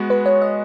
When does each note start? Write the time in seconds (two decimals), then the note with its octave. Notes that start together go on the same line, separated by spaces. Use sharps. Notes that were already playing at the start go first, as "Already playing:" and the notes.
Already playing: G#3 B3 F#4
0.10 B4
0.26 C#5
0.42 D#5